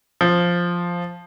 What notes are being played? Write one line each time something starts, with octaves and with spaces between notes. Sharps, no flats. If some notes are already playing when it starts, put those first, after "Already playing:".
F3